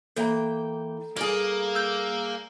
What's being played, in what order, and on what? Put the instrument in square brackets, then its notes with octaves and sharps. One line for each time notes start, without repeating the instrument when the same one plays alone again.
[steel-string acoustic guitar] E3 A#3 G5 [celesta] A4 A#5 [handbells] G6
[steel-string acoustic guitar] G2 G#4 [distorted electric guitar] A#3
[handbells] E6 G6